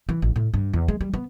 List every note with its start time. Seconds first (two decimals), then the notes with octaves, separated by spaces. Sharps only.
0.09 E3
0.22 A1
0.36 A2
0.54 G2
0.74 E2
0.88 G#3
1.01 G3
1.14 B3